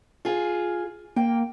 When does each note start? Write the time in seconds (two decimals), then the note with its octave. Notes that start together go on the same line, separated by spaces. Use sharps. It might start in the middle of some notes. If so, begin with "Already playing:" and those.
0.25 F4 G#4
1.16 A#3 G5